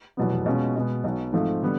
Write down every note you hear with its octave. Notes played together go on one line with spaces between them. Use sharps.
F1 E2 B2 F#3 B3
B2 G#3 C#4 F4
B2 G#3 B3
B1 B2 F#3
G#2 F3 A3 C4
D3 G3 B3